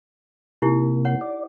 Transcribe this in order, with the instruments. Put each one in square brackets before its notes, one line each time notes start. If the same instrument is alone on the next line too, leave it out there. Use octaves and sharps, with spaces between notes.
[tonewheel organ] C3 A#3 [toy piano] D#4 E4 G4
[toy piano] C#5 F#5
[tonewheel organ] D5